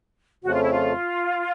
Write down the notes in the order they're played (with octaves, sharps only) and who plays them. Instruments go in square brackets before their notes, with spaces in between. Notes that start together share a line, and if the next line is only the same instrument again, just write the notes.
[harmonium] F2 C#3 F3 A3 [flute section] F#4
[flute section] F4
E4
F4